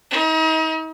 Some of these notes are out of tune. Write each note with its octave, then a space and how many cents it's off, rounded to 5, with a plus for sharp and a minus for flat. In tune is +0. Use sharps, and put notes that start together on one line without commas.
D#4 +40